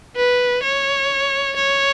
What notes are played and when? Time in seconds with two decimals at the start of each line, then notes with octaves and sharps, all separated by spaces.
0.16 B4
0.63 C#5
1.56 C#5